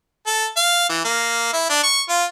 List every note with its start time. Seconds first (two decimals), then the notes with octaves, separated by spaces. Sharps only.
0.27 A4
0.57 F5
0.89 E3
1.05 A#3
1.53 E4
1.69 D4
1.83 C#6
2.09 F4